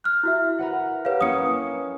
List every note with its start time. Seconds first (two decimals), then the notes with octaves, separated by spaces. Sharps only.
0.04 F6 F#6
0.23 E4 F#4 E5
0.59 A#4 B4 F#5
1.05 G4 B4 C#5 F5
1.21 A#3 C#4 E4 D#6 C#7